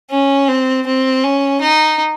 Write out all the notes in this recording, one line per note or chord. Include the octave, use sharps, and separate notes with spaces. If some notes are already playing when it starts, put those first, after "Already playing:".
C#4
C4
C4
C#4
D#4